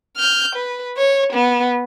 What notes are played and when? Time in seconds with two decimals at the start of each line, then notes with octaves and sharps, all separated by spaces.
0.17 F6 G6
0.55 B4
0.97 C#5
1.33 B3